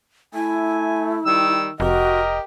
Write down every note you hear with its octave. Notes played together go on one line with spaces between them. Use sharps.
A3 E4 G#5
D#3 G3 E6
F1 F#4 G4 A#4 D#5